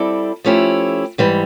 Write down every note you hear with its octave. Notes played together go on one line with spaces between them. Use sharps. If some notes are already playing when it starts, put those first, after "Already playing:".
Already playing: G3 C4 E4 A4 D5
F3 A3 C#4 E4 G4
G#2 E3 G3